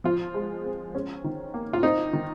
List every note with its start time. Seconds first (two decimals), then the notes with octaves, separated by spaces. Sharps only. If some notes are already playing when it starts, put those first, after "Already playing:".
0.04 F3 F4
0.34 G#3
0.64 C4
0.95 C#4
1.24 D#3
1.54 A#3
1.73 F4
1.83 C4 D#4
2.13 D#3